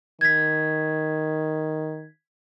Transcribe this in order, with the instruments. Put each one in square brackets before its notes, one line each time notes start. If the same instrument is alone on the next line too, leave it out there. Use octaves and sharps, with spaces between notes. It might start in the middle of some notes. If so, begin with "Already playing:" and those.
[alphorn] D#3 [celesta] G#6 B6